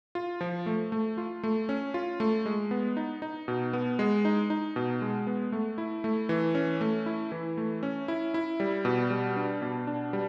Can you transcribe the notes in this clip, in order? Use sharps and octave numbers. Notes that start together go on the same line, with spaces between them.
F4
F3
A3
A3
F4
A3
C#4
F4
A3
G#3
B3
D#4
D#4
B2
B3
G#3
D#4
D#4
B2
G#3
B3
A3
E4
A3
E3
C#4
A3
E4
E3
A3
C#4
E4
E4
G3
B2
G3
D4
B2
D4
G3